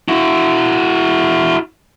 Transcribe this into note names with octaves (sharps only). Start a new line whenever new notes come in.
E4 F#4